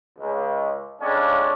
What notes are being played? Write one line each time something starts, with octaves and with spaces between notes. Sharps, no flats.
C#2
F2 C#3 G#3 C#4 D4